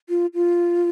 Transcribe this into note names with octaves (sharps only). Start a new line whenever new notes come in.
F4
F4